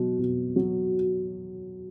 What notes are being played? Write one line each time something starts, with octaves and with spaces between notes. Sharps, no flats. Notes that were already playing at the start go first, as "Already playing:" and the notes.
Already playing: B2 F#3
B2
F#3